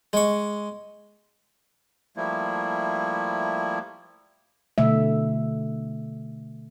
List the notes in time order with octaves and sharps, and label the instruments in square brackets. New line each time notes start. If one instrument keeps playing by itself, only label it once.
[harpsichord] G#3 C#6
[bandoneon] F3 G3 A3 A#3 E4
[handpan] B2 D3 A3 E5